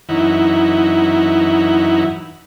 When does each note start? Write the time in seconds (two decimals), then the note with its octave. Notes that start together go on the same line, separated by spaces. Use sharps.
0.09 F#2 E3 D#4 E4 F#5